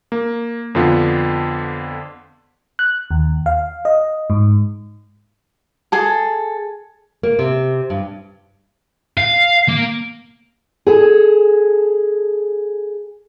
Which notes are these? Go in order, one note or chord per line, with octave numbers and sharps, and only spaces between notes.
A#3
F2 D3 B3 F4
F#6
D#2
F5
D#5
G#2
G#4 A4
A#3
C3
G2
F5
A#3
G#4 A4